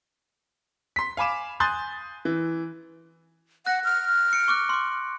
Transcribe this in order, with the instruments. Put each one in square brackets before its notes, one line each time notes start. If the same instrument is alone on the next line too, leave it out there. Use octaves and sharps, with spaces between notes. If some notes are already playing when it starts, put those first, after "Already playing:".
[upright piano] C6 B6
F5 G#5 B5 D6 E7
G#5 C6 D#6 F#6 G6 A6
E3
[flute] F#5 [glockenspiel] F#6 A#6
[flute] F6
[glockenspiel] C#7 D7
C#6 D6 F#6
C6 D6